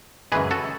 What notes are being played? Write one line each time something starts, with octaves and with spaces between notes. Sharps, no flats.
F#2 C#3 E3 G#3 G#4 B4
F#4 A4